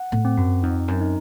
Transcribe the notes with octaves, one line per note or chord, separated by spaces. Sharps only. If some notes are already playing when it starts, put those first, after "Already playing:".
Already playing: F#5
A2
C4
F#2
F2 D#4
F#2
D#4